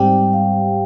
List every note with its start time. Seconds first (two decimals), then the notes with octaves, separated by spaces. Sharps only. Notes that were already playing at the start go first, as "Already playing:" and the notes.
Already playing: G#2 G3 C4 G4 G5
0.33 F5